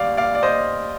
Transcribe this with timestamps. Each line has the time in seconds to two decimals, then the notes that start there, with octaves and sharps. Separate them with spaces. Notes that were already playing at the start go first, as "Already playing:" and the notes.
Already playing: D2 G3 D5 F5
0.17 D5 F5
0.35 D5
0.43 C5 D#5